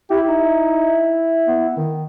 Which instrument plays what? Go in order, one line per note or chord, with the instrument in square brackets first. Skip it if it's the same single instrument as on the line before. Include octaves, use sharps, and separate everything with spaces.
[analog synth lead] E4 [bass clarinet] G4
[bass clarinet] D#4
B3
D#3